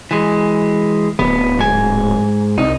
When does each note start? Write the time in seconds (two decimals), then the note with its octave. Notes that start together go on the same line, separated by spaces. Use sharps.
0.11 E3 G#3
1.19 D1 B3
1.59 G#2 G#5
2.58 C2 D#4